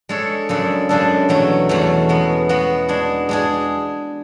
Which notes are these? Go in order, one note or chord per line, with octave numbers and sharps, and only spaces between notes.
G#3 D4 A4 C#5
F#2 C#3 G#3 D4 A4
F#2 C#3 G#3 D4 A4
E2 B2 F#3 A3 C#4
E2 B2 F#3 A3 C#4
G#3 B3 F#4
G#3 B3 F#4
G#3 D4 G#4
G#3 D4 G#4